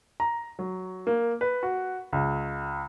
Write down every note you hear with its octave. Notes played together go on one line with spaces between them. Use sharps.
A#5
F#3
A#3
B4
F#4
C#2